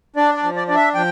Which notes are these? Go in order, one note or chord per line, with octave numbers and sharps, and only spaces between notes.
D4 D5
D5
F3
D5
D4 D5
E5
F3 G5